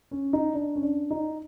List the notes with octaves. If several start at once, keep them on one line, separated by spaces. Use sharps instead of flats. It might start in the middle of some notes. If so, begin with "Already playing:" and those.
C#4
D#4
D4
C#4
D4
D#4